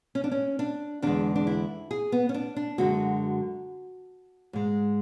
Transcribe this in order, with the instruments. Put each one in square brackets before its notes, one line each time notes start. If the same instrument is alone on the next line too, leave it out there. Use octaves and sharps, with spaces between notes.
[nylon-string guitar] C#4
D4
C#4
D4
E2 D3 G#3 D4
D4
E4
G#4
B3
C#4
D4
D4
F#2 D3 G#3 F#4
G#2 G#3